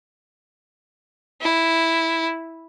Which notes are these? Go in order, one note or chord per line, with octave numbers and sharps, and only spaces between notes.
E4